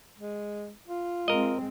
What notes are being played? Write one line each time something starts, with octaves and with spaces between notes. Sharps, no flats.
G#3
F4
G#3 C4 A#4 D#5